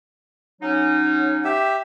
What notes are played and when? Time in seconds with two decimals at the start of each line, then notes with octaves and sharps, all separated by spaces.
0.61 F#3 C#4 D#4
1.45 G4 E5